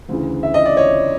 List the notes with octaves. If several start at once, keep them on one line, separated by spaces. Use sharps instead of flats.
D2 C#3 E3
E5
D#5
D5
C#5 D#5